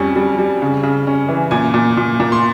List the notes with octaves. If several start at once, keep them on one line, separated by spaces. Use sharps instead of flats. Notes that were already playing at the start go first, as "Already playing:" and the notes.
Already playing: F2 G3 C#4
G3
G3
C#3
C#3
C#4
E3
A#2 G#5
A#2
A#2
A#2
C6